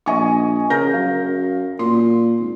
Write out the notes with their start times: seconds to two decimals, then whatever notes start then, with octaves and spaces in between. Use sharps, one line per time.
0.06 A#1 D#5 G#5 C#6
0.70 C#3 A#4 G6 A#6
0.93 F#2 F5
1.79 A#2 C6
2.40 G#1